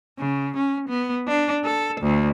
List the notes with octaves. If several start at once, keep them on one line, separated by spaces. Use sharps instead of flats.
C#3
C#4
B3
D4
A4
D2